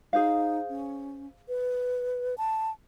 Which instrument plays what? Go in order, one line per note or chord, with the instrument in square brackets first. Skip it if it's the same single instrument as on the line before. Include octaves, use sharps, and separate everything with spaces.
[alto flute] D#4 [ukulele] G#4 C5 F5
[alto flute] C#4
B4
A5